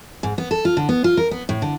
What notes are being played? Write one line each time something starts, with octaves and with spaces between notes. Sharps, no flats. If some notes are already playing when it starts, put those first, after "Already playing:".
G#2
B3
A4
F4
D3
B3
F4
A#4
B3
A2
D3